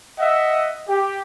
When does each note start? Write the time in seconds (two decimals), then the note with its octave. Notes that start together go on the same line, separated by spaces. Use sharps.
0.19 D#5 E5 F#5
0.89 G4